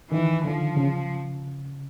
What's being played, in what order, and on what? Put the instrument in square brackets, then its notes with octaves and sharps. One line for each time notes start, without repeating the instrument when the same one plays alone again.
[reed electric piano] D#3 [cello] E3
[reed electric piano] D3 [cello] F3
[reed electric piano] C#3